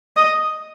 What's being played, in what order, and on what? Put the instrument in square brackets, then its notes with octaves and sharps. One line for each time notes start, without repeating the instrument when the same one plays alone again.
[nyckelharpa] D#5